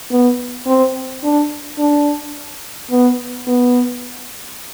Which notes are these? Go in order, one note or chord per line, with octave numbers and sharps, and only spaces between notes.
B3
C4
D4
D4
B3
B3